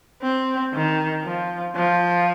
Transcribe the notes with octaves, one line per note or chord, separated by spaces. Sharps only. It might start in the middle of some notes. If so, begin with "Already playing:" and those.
C4
D#3
F3
F3